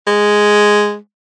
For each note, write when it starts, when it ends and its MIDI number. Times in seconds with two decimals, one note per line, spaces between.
0.07 0.96 56